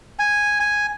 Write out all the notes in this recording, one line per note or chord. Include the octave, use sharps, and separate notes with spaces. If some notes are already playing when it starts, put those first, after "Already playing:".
G#5
G#5